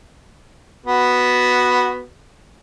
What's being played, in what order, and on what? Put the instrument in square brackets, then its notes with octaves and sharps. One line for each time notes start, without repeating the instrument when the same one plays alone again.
[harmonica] B3 F#4